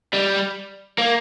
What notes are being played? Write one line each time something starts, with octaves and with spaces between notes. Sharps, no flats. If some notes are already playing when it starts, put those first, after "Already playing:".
G3
A#3